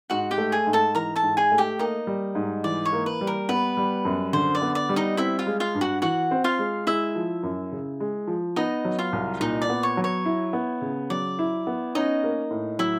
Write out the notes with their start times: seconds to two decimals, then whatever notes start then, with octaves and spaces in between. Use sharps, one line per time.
0.10 G#2 F#4 F#5
0.31 G4 G5
0.38 A3
0.52 G#4 G#5
0.67 G#2
0.73 A4 A5
0.94 E3 A#4 A#5
1.16 A4 A5
1.22 G#2
1.37 G#4 G#5
1.52 A3
1.58 G4 G5
1.79 A#3 D#4 D#5
2.07 G3
2.35 G#2
2.64 E3 D5
2.85 C#5
2.92 A#3
3.06 B4
3.21 G3
3.27 A#4
3.49 B3 B4
3.77 G3
4.05 F#2
4.33 D3 C5
4.55 D5
4.62 B3
4.75 D5
4.89 G3
4.96 D#4 D#5
5.17 C4 E4 E5
5.39 F4 F5
5.47 G#3
5.60 F4 F5
5.75 G2
5.81 F#4 F#5
6.02 E3 F#4 F#5
6.31 C4
6.44 F4 F5
6.59 G#3
6.87 G#3 E4 E5
7.16 F3
7.43 F#2
7.72 C#3
8.00 G#3
8.27 F3
8.56 B3 D#4 D#5
8.85 F#3
8.99 F4 F5
9.13 C2
9.40 A#2 D#4 D#5
9.62 D5
9.70 B3
9.83 C#5
9.97 F#3
10.04 C#5
10.25 E4
10.53 B3
10.81 C#3
11.10 F#3 D5
11.39 E4
11.67 B3
11.95 C#4 D#4 D#5
12.24 A#3
12.51 A2
12.79 F#3 E4 E5